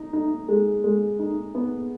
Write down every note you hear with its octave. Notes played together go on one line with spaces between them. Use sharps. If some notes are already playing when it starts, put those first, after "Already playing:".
Already playing: D#4
D#4
G#3
G#3
D#4
B3